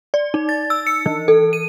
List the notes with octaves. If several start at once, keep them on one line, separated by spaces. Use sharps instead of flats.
D5
D#4
A6
E6
C#7
E3
A4
D#7